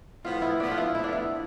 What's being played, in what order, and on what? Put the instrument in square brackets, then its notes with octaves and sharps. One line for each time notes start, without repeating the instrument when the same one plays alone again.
[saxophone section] A2 F3 B3 [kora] F4
[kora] E4
[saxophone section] A2 F3 B3 [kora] D4
[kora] F4
E4
[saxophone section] A2 F3 B3 [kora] E4
[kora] D4
E4
[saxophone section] A2 F3